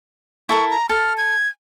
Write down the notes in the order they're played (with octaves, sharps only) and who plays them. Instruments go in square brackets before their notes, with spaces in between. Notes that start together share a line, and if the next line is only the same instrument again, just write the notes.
[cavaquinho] E4 A4 A#4 [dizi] C#6
[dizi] A#5
[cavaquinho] A4 A5 [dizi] F6
[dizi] G#6